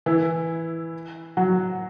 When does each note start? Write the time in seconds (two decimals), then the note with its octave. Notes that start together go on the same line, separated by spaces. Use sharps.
0.06 E3 E4
1.37 F#3 F#4